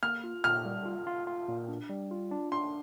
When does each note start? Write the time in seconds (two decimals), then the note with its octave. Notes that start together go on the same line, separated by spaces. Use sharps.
0.03 A#3 F6
0.24 F4
0.44 A#2 F6
0.65 G3
0.85 F4
1.07 F4
1.27 F4
1.48 A#2
1.68 D4
1.90 G3
2.11 F4
2.31 D4
2.52 D4 C6